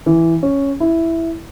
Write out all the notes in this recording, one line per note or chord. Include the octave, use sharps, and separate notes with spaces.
E3
C#4
E4